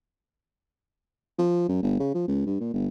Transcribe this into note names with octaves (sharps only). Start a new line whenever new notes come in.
F3
F#2
G1
C#3
F3
C#2
G2
A#2
G1